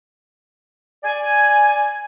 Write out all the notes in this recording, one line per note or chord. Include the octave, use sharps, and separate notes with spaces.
D5 G#5